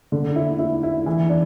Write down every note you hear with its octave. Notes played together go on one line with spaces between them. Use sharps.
D3
E4
E4
E4
E3
D4